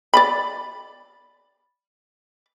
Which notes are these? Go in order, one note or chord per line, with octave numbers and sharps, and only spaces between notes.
D5 D#5 B5